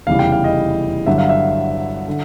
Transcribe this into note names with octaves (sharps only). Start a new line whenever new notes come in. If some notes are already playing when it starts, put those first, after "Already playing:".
F1 E2 C#3 E3 G3 F5
G5
F5
D#5
G1 G2 D3 F#3 E5
F5
E5
D3